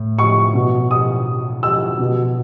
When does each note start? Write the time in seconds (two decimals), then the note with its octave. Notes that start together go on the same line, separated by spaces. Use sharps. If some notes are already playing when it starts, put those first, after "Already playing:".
Already playing: A2
0.19 C#6
0.54 B2
0.91 D#6
1.63 E6
1.99 B2